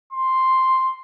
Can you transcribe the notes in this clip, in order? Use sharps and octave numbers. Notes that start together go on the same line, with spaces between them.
C6